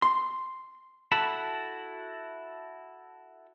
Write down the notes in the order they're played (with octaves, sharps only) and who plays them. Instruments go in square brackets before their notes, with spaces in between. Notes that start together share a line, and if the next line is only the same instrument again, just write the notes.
[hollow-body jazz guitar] C6
[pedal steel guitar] E4 F#4 A4 A5 B5